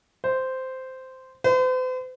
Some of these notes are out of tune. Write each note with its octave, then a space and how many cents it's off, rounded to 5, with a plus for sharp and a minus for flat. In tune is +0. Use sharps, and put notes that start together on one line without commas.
C5 -10
C5 -45